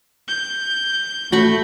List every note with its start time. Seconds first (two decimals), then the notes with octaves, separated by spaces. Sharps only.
0.28 G6
1.32 A3 F#4 B5 C#6